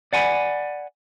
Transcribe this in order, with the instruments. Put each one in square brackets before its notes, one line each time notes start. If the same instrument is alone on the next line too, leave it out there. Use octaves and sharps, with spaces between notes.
[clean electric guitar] D5 F#5 G#5 A#5 B5